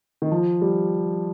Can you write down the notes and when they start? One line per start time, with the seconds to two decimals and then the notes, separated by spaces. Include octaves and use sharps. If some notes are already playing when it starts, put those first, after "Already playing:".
0.22 D#3
0.32 F3
0.62 G3